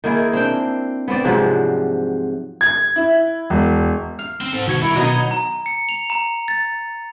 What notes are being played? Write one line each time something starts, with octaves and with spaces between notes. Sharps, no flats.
D#3 A#3 E4 G#4
C4 D4 G5
B3 C4 D5
G#2 C3 F3 F#3
G#6
E4
E1
F5
C4
G#2 C4 A4
B2 D#3 F#4 G#6 C#7
C2 E4 A#4
B2 F#3 B3 D#4 D#5
A#5
C#7
F7
A#5
A6